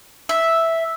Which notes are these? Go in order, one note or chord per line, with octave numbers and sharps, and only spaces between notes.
E5